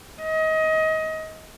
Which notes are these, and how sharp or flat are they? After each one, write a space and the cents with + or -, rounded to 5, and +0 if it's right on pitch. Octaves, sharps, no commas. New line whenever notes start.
D#5 +25